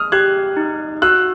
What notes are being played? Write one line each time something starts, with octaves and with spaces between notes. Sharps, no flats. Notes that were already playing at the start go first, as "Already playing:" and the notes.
Already playing: D#6 F6
G4 F#6 G#6
D#4
F#4 E6 F#6